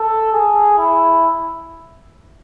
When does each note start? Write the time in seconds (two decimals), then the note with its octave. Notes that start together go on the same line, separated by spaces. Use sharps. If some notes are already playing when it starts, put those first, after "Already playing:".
Already playing: A4
0.33 G#4
0.78 E4